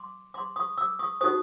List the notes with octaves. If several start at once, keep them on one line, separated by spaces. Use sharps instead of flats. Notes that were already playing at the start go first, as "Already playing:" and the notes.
Already playing: C6 D6
C6 D6
C#6 D#6
D6 E6
C#6 D#6
D#4 F#4 A4 C5 C#6 D#6